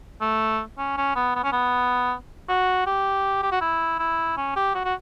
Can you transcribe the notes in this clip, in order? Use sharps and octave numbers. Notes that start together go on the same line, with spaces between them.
A3
C#4
C#4
B3
B3
C#4
B3
F#4
G4
G4
F#4
E4
E4
C#4
G4
F#4
F#4